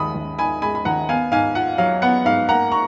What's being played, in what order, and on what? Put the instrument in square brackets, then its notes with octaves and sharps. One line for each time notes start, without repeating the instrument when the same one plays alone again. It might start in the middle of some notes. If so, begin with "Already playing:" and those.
Already playing: [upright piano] D#2 G#3 B5 D#6
D#2
D#3 G#5 B5
G#3 G#5 B5
B5
D#2 F#5 A#5
B3 F5 G#5
G#2 F5 G#5
F4 F#5
F#3 F5
B3 F#5
G#2 F5
A#3 F#5 A#5
A#5 C#6